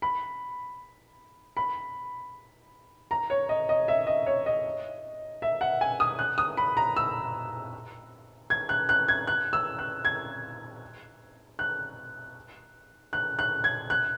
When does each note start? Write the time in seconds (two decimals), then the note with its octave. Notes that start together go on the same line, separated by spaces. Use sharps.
0.02 B5
1.57 B5
3.11 A#5
3.30 C#5
3.49 D#5
3.69 D#5
3.88 E5
4.07 D#5
4.26 C#5
4.46 D#5
5.42 E5
5.61 F#5
5.81 G#5
6.00 D#6
6.19 F#6
6.38 D#6
6.57 B5
6.77 A#5
6.96 E6
8.50 G#6
8.69 F#6
8.89 F#6
9.08 G#6
9.27 F#6
9.53 E6
9.79 F#6
10.05 G#6
11.59 F#6
13.13 F#6
13.39 F#6
13.64 G#6
13.90 F#6